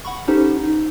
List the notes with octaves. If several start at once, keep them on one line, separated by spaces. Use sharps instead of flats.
F#5 B5 C#6
C#4 D#4 G4 A4 C5
D#4